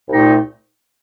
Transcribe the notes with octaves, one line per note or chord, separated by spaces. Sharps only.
C2 A#2 A3 D#4 G4